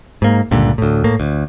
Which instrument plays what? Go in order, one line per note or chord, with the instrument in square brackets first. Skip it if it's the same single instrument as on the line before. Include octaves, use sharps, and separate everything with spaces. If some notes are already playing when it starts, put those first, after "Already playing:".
[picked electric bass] G#2 A#3
C#2 G2 A#2 D3
D2 A2
A2 A#3
D2